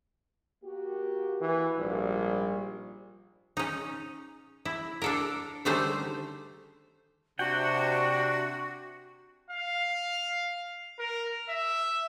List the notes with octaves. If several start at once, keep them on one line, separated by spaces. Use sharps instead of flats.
A#3 F#4 G4
E3
A#1 G#2 G3
C#4 D#4
E4
D4 A4 A#4
D3 D#3 G3 A3 C#4 C5
C3 D4 F#4 F#5 G5
F5
A#4
E5